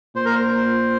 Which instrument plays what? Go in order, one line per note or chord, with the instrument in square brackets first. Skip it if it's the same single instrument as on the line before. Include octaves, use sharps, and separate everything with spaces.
[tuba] A#2 [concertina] C5
[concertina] A#4
C5